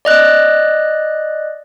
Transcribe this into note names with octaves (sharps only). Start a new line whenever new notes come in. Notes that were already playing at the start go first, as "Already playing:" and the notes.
D5 D#5 F#6